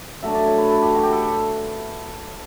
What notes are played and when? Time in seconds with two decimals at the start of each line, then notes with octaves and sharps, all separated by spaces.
0.23 F#3 A3 D4 E5
0.34 D5
0.46 C#5
0.58 B4
0.71 A4
0.82 G4
0.95 F#4
1.03 G4
1.13 A4